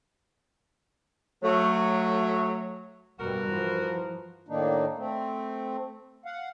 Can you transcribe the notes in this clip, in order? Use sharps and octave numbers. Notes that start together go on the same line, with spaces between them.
F#3 A3
G2 B2 G3 F#4 A#4
E3 F3
A2 D#3 A#3 D4 D#4
A3 C4
F5 F#5